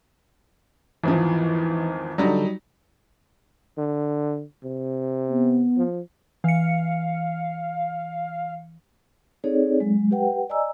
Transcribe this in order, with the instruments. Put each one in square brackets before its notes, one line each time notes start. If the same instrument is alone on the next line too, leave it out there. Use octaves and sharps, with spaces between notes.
[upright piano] G#1 E2 F3 [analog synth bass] E3
[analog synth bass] D3 [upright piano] F#3 G3 D#4
[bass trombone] D3
C3
[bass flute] B3
[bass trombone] F3
[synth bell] E3 C#7 [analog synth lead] F5
[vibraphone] C4 D#4 G#4 A4 C#5 D5
F#3 G#3
G4 B4 F#5 G5
D5 D#5 G#5 A#5 E6